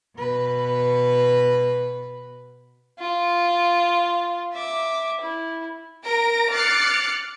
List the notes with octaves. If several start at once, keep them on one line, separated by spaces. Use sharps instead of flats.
B2 B4
F4
E5 D6
E4
A#4 A#6 D7
D6 F6 F#6 A6 C7 C#7